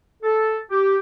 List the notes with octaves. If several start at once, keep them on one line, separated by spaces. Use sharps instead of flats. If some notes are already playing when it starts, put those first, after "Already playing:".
A4
G4